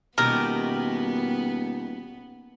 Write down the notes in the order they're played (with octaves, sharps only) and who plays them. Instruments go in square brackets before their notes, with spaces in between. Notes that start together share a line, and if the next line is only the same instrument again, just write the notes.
[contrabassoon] D#1 [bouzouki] B2 D#3 G4 [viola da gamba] B3 [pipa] A#4